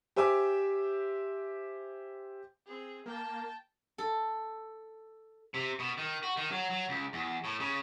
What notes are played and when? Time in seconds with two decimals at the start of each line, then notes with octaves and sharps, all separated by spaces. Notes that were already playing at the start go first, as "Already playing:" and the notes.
0.16 G4 C5 E5 G#5 D6
2.66 C4 G#4
3.06 A#3 G5 A5
3.98 A4
5.54 C3
5.79 B2
5.97 D#3
6.23 F#4
6.37 D#3
6.51 F#3
6.70 F#3
6.89 C#2
7.13 E2
7.44 A2
7.60 C#3